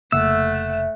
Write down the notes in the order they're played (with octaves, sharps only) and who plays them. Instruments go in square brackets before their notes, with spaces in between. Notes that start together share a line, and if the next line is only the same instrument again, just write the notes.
[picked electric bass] F1 C#3 A#3 [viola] A3 F#5 [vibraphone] E5 [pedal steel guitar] E6